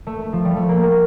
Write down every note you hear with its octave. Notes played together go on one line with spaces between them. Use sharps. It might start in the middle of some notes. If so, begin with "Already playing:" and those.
A3
F3
G3
A3
A#3